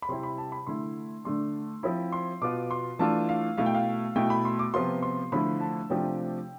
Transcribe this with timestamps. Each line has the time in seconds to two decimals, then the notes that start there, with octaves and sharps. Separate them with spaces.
0.02 B5
0.09 C3 G3 C4 E4 C6
0.23 B5
0.38 A5
0.52 B5
0.67 D3 A3 E4 C6
1.25 D3 A3 D4 C6
1.83 F3 C4 E4 B5
2.12 C6
2.41 B2 B3 F4 D6
2.71 C6
2.99 E3 A3 D4 F4 A5
3.29 F5
3.58 B2 A3 E4 F5
3.66 G5
3.74 F5
4.16 B2 A3 E4 G5
4.30 B5
4.45 C6
4.59 D6
4.74 C3 F3 B3 F4 C6
5.03 C6
5.32 D3 F3 A3 E4 B5
5.61 A5
5.90 C3 F3 A3 D4 F4 G5